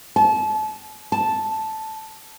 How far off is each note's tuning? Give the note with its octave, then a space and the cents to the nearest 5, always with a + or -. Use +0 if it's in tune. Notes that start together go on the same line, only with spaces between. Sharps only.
A5 -35
A5 -5